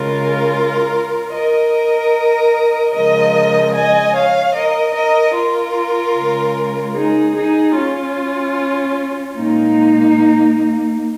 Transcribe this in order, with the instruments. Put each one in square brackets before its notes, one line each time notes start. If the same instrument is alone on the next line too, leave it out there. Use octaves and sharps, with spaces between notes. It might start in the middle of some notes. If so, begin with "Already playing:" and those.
Already playing: [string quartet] C#3 G#3 F4 A#4
A#4 D#5
C#3 F3 G#3 A#4 D#5
D#5 G#5
C#5 F5
A#4 D#5
A#4 D#5
F4 A#4
C#3 G#3
D#4 G#4
D#4 G#4
C#4 F4
A#2 G#3 A#3 D#4